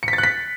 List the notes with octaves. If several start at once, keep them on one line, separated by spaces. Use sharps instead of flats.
C#7
B6
A6
F#6
B6